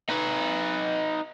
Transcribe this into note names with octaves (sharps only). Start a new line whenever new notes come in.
D#4 B4